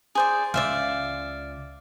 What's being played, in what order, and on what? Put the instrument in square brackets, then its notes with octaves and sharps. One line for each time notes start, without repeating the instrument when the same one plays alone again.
[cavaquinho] G#4 C5 D5
[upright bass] C#2 [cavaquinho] D5 E5 F5